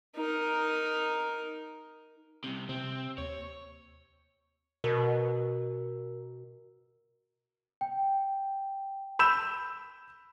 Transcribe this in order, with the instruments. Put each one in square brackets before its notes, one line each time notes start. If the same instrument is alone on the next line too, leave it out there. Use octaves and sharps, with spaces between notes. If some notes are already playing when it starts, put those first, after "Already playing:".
[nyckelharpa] D#4 A#4
[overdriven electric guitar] C2 C3
[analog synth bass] C3 [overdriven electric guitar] C4
[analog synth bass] D#2 [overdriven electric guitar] C#5
[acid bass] B2 [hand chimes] A#4
[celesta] G5
[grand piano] B5 E6 G6 E7